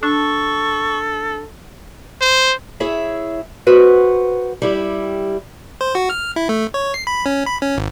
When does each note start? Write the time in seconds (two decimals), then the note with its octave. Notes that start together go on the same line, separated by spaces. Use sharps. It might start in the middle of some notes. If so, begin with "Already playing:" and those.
0.03 D4 A4 C#6
2.21 C5
2.80 E4 G#4 C#5 E5
3.67 F#4 B4 C5 F#5
4.62 G3 E4 G4
5.81 C5
5.95 F#4
6.10 F6
6.36 E4
6.49 A3
6.74 C#5
6.94 C7
7.07 B5
7.26 C#4
7.46 B5
7.61 C#4
7.77 G#1